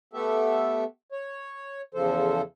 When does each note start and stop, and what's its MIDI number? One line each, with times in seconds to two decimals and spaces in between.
0.13 0.84 57
0.13 0.84 59
0.13 0.84 67
0.13 0.84 69
0.13 0.84 76
1.12 1.81 73
1.94 2.42 40
1.94 2.42 49
1.94 2.42 53
1.94 2.42 69
1.94 2.42 72